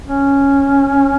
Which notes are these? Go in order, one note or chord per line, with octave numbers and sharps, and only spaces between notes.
C#4